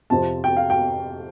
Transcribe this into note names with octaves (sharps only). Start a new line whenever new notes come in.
F2 C3 F3 C4 A5
G5
F5
G5